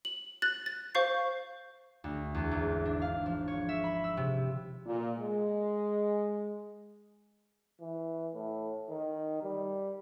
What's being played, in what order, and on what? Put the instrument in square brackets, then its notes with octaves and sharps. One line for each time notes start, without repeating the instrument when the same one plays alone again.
[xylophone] F#7
F#6 A6 F#7
A6
C5 F5 C#6 G6 C7
[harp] D2
E2
G#1
D4
F5
F3
C#5
E5
B5
E6
C3
[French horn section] A#2
G#3
[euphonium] E3
A2
D#3
G3